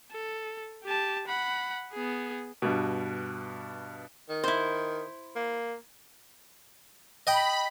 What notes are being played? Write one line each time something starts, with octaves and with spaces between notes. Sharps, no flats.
A4
G4 A5
F#5 B5
B3 G#4
G2 B2
D#3
E4 C5
A#3
D#5 G5 B5